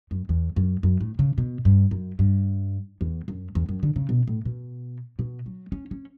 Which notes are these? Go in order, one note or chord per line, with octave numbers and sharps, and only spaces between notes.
F#2
E2
F#2
F#2
A2
C#3
B2
G2
F#2
G2
E2
F#2
E2
F#2
D3
C#3
B2
A2
B2
B2
F#3
C#4
C#4